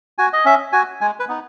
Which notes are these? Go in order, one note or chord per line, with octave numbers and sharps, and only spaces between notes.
F#4 G#5
D#5
C#4 E5
F#4 G#5
G#3 G#5
B4
B3 D#4